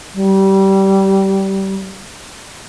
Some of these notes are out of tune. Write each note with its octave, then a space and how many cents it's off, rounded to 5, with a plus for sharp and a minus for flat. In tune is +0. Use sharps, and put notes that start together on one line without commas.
G3 -20